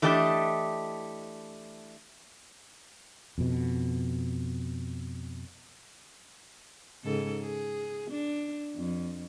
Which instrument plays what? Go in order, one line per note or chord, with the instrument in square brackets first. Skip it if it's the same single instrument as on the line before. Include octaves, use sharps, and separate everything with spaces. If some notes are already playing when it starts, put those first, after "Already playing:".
[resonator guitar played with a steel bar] E3 A3 D4 G4 D#5
[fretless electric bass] F2 B2
[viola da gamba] G#2 C#3 A4
G#4
D4
F2